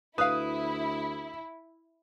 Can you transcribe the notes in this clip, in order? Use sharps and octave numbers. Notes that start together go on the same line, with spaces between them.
D2 E4 B4 F5 D#6